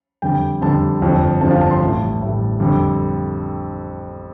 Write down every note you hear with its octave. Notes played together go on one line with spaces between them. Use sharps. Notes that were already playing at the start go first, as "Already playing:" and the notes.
F2 D3 G3 G5
F2 D3 G3 A5
G1 F2 F3
G1 F2 F3 A5
F5
A5
C6
A1 A2 G3 A5
A1 A2 G3
F2 D3 G3